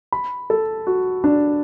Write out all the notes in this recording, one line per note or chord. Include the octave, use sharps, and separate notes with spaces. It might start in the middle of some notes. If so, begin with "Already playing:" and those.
B5
A4
F#4
D4